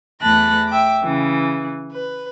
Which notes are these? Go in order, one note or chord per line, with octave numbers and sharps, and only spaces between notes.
E2 A3 A5 B5 F#6 A#6
E5 G5 D6
C#3 E3
B4